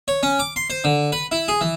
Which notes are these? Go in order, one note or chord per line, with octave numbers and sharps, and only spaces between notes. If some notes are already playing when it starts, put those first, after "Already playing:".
C#5
C#4
D6
C6
C5
D3
B4
E4
G#4
E3